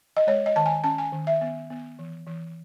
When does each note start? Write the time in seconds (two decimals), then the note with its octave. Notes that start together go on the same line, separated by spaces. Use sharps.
0.17 D#5
0.27 G#3 C#5
0.46 D#5
0.56 D#3 A5
0.66 G#5
0.84 C#4 A5
0.98 G#5
1.12 D#3
1.27 E5
1.41 B3
1.70 B3
1.99 E3
2.27 E3